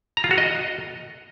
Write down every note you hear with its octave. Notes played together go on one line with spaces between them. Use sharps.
A#5
F4
F#4
D#5